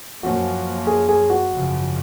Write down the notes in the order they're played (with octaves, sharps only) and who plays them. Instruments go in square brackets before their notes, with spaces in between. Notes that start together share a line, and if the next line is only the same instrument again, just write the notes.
[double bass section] F#2 F3 A#3 C#4 [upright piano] F#4
[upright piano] G#4
G#4
F#4
[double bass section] G#1 F#2 C#3 F3